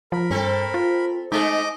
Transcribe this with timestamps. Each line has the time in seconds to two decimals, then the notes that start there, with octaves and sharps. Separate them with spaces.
0.12 F3 A#4 B5
0.31 G2 C4 A4
0.74 F4
1.32 G#3 A3 C4 D#4 D#5 D6